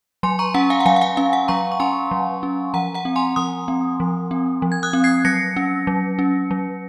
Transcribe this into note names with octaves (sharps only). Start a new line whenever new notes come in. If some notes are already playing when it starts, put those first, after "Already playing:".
F#3 G#5 C6
A#5 C#6
C#4 F#5 A#5
F5 G#5
F#5
F#3 F5 G#5
F#5
F5 G#5
C#4 F5
F#5
F#3 A#5 C#6
C#6
C#4 G#5 C6
F#3
C#4
F3 F#5 A#5
F#5 A#5
C4
G#5 C6
F3 C6 D#6
C4
F3
C4
F3
G#6
D#6 F#6
C4
G#6 C7
F#3 A#6 C#7
C#4
F#3
C#4
F#3